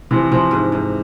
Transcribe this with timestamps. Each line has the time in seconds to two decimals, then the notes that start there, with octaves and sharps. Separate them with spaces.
0.11 C3 E3 F3
0.31 C3 E3 F3
0.51 G#2
0.72 G#2